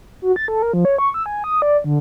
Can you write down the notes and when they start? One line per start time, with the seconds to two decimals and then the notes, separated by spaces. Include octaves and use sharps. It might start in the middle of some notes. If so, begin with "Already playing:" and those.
0.22 F#4
0.36 A6
0.48 A4
0.62 A#4
0.73 F3
0.85 C#5
0.98 C#6
1.14 E6
1.26 G#5
1.44 D#6
1.62 D5
1.84 D3